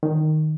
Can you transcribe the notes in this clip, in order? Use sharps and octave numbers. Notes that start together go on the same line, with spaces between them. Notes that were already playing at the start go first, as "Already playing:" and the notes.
D#3